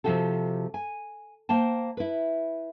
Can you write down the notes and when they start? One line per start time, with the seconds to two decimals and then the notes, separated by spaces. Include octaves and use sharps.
0.04 C3 F3 C4 F#4 G4 A4
0.74 G#5
1.49 A#3 C5 G5 A5
1.97 E4 B4